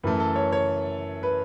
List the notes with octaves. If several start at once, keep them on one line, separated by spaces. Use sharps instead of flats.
F#2 E3 A3 B4
A4
C#5
C#5
B4